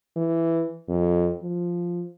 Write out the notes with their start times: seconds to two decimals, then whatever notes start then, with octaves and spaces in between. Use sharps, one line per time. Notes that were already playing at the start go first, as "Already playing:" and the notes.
0.16 E3
0.89 F2
1.42 F3